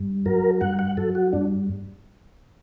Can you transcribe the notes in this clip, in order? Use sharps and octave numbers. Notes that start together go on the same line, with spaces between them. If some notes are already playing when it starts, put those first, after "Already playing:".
Already playing: G2
F#3 A#4
G2 F#5
F#5
F#3 A4
F#4
G2 D4